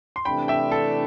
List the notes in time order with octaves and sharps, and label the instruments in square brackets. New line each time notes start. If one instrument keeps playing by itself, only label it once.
[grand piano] C6
[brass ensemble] C3 E3 A3 D4 [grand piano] G5 B5
[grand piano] E5 G5
A4